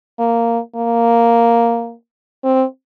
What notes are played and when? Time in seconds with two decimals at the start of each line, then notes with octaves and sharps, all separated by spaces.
0.20 A#3
0.76 A#3
2.44 C4